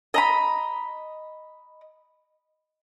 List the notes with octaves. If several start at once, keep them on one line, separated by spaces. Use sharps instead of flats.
D#5 A#5 B5